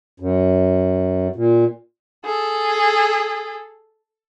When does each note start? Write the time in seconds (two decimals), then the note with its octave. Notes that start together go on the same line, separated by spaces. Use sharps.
0.20 F#2
1.36 A#2
2.25 G#4 A4